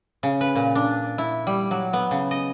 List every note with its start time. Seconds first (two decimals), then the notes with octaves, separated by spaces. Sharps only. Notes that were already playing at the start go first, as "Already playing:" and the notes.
0.23 C#3
0.41 B4
0.55 A#2
0.75 D4
1.18 E4
1.47 G3
1.71 F#3
1.93 B3
2.11 C#3
2.31 D#5